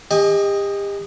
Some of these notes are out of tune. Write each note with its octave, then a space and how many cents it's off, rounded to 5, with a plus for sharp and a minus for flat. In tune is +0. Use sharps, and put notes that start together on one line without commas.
G4 +35 D#5 +0 G#5 +15